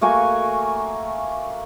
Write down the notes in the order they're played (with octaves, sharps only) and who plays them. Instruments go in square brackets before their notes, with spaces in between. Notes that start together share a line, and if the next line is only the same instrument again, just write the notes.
[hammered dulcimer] A3 A#3 F#4 G#5